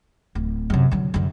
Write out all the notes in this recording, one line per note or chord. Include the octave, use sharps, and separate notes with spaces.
D1
F#2 C3
D3 F#3
F#2 D3